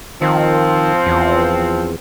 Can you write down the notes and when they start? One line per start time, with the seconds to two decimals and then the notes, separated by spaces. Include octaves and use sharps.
0.22 D#3 F3 C4
1.06 E2